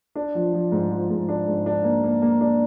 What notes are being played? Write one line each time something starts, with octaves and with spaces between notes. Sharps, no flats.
D4
F3
F3
G#2
F3
G#2
D4
G#2
D4
A#3
A#3
A#3
D4